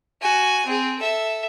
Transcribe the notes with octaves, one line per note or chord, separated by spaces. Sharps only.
F#4 G#5
C4 G#4
A4 E5